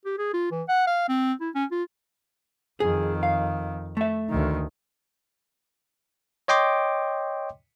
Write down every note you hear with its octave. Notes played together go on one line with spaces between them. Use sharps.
G4
G#4
F4
E3
F#5
F5
C4
E4
C#4
F4
F2 D#3 G#4
F5
A3 E5
D2 D#3
C#5 D#5 G5 C6 D6